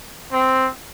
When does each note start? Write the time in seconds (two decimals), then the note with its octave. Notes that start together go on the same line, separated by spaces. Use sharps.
0.33 C4